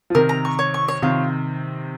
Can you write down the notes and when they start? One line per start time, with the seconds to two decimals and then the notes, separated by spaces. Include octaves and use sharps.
0.10 F3
0.15 C3 D#3 A#4
0.29 A#5
0.45 C#6
0.59 C#5
0.74 C#6
0.88 C#5
1.02 C3 D#3 F4